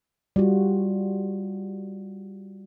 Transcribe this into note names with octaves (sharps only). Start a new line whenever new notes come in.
G3 F4 F#4